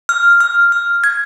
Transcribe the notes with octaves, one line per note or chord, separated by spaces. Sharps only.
F6
F6
F6
G#6